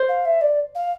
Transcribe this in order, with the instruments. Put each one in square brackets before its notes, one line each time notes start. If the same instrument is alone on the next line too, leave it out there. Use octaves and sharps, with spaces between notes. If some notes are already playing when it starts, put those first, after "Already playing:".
Already playing: [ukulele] C5
[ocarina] F5
E5
D5
F5